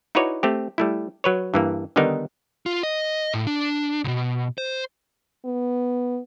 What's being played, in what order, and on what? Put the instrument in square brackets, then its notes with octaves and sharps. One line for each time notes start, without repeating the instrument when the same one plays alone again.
[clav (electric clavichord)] D#4 E4 F#4 B4 C#5 D5
A3 C4 G4
G3 A3 E4
F#3 B4 C#5
G2 E3 A#3
D3 D#3 G3 B3 D#4 A#4
[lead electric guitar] F4
D#5
A2
D4
C2 B2
C5
[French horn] B3